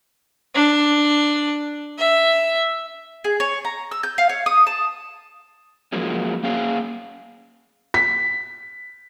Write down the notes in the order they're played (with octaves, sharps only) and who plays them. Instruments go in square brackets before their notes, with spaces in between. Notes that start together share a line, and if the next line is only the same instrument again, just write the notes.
[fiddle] D4
E5
[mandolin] G#4
C#5
A#5
E6
G6
F5
C#5
D#6
A5
[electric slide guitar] F3 F#3 G#3 A#3 C#4
A#3 C#4 G#4 F5
[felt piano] B6